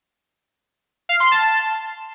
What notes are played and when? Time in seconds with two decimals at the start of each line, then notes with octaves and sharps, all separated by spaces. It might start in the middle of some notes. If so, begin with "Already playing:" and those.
1.09 F5
1.20 C6
1.31 A5